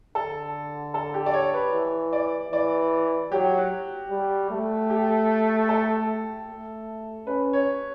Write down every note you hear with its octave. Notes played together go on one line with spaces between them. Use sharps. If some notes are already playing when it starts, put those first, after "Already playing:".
D3 A4
A4
G4
D5
C#5
B4
E3
D5
E3 D5
F#3 G4
F#4
G3
A3
G4
A4
A3
C#4 B4
C#5